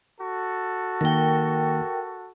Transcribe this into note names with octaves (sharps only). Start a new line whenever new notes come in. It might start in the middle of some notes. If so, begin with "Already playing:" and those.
F#4 A4
D#3 A#3 A#4 G5